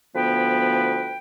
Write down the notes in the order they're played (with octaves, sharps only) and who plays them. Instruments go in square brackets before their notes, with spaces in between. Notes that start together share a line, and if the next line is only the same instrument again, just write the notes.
[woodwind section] D2 F3 B3 B4 G5